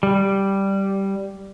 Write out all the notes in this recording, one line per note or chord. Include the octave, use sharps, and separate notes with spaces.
G3